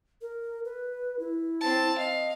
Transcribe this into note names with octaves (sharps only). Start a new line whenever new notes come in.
A#4
B4
E4
C4 A5
D#5 F5